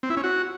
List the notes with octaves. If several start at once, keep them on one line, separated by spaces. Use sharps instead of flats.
C4
E4
C#4
F#4